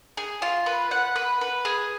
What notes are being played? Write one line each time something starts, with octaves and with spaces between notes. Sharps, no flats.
G#4
F4
B4
F#5
B4
B4
G#4